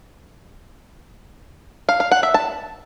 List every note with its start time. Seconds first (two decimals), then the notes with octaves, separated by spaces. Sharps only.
1.89 F5
2.00 F5
2.11 F#5
2.23 E5
2.34 A5